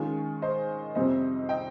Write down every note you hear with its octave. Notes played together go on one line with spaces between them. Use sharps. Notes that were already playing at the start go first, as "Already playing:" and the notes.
Already playing: D#3 G#3 C#4 F4 G#4
C5 D#5
F2 C3 G3 C4 C5 D#5
D#5 G5